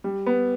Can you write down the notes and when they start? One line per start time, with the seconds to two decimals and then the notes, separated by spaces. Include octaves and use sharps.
0.04 G3
0.26 B3